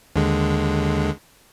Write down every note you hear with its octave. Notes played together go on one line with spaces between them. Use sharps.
D#2 D3 G#3